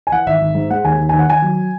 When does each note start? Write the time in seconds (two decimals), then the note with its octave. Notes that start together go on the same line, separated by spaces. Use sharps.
0.07 G#5
0.12 E3 F#5
0.26 G#1 E5
0.41 G#1
0.55 G#2
0.70 G#3 F#5
0.84 D#2 G#5
1.00 D#2
1.09 D#3 G#5
1.19 F#5
1.28 D#3 G#5
1.42 F#3